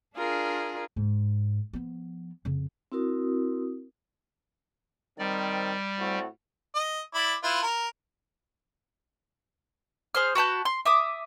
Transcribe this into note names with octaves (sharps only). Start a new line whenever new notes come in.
D4 F4 G#4 A#4
G#2
F3 B3
F2 C#3
C4 E4 F#4 A#4 D#6
D#3 G3 C4 D5
A2 C4 F#4
D#5
E4 D5 B5
E4 F4 B4
A#4
G#4 C5 F6
F#4 B4 A5 G6
C6
E5 D6 D#6